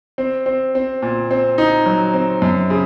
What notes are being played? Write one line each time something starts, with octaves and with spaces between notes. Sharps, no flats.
C4
C4
C4
A#2
C4
D#4
F#3
C4
F#2
C#3